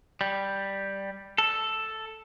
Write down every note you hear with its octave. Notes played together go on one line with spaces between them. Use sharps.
G3
A4